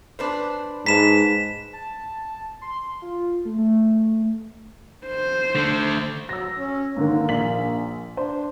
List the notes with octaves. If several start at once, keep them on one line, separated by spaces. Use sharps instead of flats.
D4 B4 C5
G#2 B4 A5 B6 E7
A5
C6
F4
A3
A3
C5
D3 A3
F#3 E6 A#6
C#4
G#2 D3 D#3 A#3
A#1 B6 F#7
D4 C5